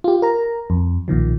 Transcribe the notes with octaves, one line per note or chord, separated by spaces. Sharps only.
F4 G4
A#4 A#5
F2
B1 A#2 D#3 F3